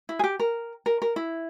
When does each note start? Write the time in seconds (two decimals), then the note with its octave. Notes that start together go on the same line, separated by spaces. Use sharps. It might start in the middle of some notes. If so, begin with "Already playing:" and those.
0.09 E4
0.19 G#4
0.24 G4
0.40 A#4
0.86 A#4
1.02 A#4
1.16 E4